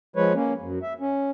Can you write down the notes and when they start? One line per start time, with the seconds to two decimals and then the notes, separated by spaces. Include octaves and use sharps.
0.16 F3 G#3 B4 C#5
0.34 A#3 C#4
0.61 F#2
0.82 E5
1.01 C#4